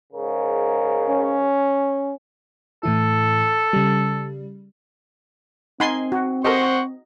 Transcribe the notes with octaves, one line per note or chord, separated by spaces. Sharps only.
G#2 C#3 A#4
C#4
A2 E3 E4 A4
C#3 G3
C4 D#4 F#5 G#5 B5 C6 A6
F#4
G4 A4 A#4 C5 D#5 F#5 C#6